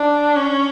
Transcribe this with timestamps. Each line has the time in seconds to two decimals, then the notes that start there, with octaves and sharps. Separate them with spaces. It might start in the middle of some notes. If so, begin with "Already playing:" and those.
Already playing: D4
0.36 C#4